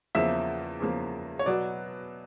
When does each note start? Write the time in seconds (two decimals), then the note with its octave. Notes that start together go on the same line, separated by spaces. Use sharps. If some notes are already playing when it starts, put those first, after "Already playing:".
0.15 E2 C#3 F3 A#3 E5
0.80 E2 C#3 F3 A#3
1.39 C#5
1.46 B2 F#3 B3 D5